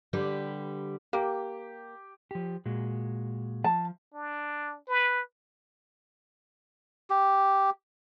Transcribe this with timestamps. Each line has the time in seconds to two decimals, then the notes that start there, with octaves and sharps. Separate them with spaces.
0.13 D3 G3 G4 B4
1.13 A#3 G4
2.31 F3 G4
2.66 A#2 G#3 F#4
3.64 F3 A5
4.14 D4
4.88 B4
7.10 G4